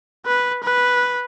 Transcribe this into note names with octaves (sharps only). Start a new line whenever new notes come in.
B4
B4